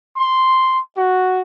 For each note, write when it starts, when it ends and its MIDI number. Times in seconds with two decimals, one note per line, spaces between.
0.17 0.79 84
0.97 1.41 66